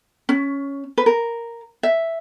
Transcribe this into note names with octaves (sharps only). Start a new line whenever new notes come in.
C#4
B4
A#4
E5